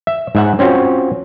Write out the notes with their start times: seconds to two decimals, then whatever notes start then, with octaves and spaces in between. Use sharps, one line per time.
0.07 E5
0.35 G#2 E5 F#5
0.59 C4 C#4 F4 F#4